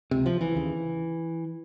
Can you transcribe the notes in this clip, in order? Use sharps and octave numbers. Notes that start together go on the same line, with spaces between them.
C#2 C3
F3
E3
D#2 C#3